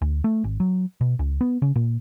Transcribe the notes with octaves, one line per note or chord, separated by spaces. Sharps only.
D2
A3
G#1
F#3
B2
C#2
B3
C#3
A#2